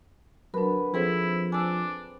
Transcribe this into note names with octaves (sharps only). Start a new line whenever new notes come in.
D3 F#3 D4 A#4 B4
F3 C4 E4 G#4 A4 C5
D4 G#5 E6